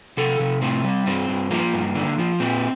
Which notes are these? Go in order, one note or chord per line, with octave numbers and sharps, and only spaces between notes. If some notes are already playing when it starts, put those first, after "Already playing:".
C3 A4
C3
A2 C4
G3
G2 C4
G2
F3 A#3
G2
D3
F3
A#2 C4